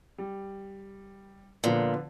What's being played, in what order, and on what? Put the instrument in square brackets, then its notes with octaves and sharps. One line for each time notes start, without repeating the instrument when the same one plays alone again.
[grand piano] G3
[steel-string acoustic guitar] A#2 [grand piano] D3 F3 B3